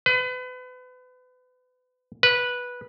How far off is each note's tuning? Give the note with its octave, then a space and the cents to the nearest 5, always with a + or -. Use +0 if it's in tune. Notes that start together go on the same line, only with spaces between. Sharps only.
B4 +35
B4 -10